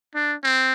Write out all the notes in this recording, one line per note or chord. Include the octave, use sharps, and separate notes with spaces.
D4
C4